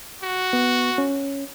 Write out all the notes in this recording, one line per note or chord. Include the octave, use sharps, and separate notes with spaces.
F#4
B3
C#4